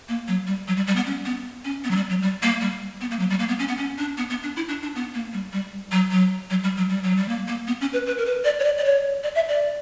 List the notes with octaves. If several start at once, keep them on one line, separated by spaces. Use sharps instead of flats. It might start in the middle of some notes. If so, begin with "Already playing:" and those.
A#3
F#3
G3
F#3
G3
G3
B3
C#4
B3
C#4
B3
F#3
G3
F#3
G3
A#3
G3
B3
A#3
F#3
G3
A#3
B3
C#4
B3
C#4
D4
B3
B3
D4
E4
D4
D4
B3
A#3
G3
G3
F#3
F#3
F#3
G3
F#3
G3
F#3
G3
A#3
A#3
B3
C#4
B4
B4
A#4
B4
D5
C#5
D5
D5
C#5
D5
E5
D5